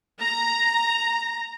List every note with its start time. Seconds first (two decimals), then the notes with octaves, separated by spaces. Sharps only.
0.20 A#5